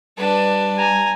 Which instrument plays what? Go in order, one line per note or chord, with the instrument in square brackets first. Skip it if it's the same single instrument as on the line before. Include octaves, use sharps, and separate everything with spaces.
[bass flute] G3 [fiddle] D4 B4
[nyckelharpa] G#5 [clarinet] A#5